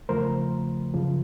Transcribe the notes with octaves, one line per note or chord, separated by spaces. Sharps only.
E2 C#3 F3 A3 A#4 C5
F#2 C#3 F3